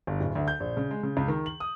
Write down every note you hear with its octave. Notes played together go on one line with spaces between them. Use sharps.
G1
D1
D2
G6
A#1
C#3
G#3
C#3
C#2
D#3
F#7
D#6